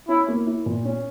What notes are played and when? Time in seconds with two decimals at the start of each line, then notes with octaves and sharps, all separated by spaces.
0.09 C#4 E4
0.28 A#3
0.47 E4
0.66 A#2
0.85 C#4